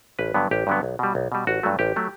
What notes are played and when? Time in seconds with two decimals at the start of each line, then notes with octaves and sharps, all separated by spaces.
0.19 A1 B4
0.34 G2 D3 F#3 B3
0.51 A1 G4
0.67 G2 D3 F#3 B3
0.83 B1
0.99 B2 G3
1.15 B1
1.32 B2 G3
1.47 A1 F#4
1.63 G2 F#3 A3
1.79 A1 G4
1.96 F#3 A3